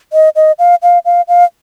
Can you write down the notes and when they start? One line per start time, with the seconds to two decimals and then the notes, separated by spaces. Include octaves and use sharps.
0.13 D#5
0.36 D#5
0.59 F5
0.83 F5
1.05 F5
1.28 F5